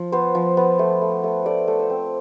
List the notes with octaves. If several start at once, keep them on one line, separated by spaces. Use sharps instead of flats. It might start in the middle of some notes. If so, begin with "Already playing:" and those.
Already playing: F3
B3 C5
F3
B3
A3
A3
A3
A3 D5
A3
C5
C4